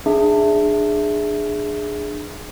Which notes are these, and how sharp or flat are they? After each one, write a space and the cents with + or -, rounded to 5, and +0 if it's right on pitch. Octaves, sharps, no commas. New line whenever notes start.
D4 +25 G#4 +0 E5 +0